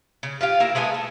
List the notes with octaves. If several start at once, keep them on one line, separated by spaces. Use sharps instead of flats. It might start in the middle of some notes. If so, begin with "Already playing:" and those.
C#3
F4 G4 F5
A#3 E4 A#4
G#3 A3 B3 G#5
A5